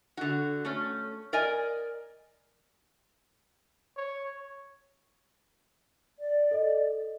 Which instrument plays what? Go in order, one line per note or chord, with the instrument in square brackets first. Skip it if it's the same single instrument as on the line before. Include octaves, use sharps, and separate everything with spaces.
[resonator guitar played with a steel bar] D3 F#4
A3 C#4
A#4 D5 D#5 G#5
[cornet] C#5
[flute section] D5
[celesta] A4 D#5